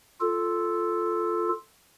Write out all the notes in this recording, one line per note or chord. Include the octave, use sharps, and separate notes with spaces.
F4 A4